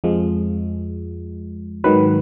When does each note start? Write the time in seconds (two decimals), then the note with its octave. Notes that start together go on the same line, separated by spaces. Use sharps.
0.04 F2 F3 G#3
1.84 G#2 D#3 F#3 B4